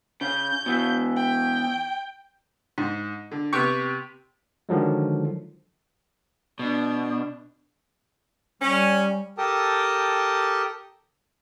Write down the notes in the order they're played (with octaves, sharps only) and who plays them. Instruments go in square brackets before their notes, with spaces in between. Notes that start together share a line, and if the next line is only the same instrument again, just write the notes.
[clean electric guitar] C#3 [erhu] G6
[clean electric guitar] B2 E3
[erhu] G5
[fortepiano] G#2
D3
C3 B3 G4 G5 C#6
[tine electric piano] D3 D#3 F3 F#3 G#3
[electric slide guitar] B2 [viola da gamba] D4
[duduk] G3 [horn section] C#4
[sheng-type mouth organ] G4 A4 A#4 G5 A5 D#6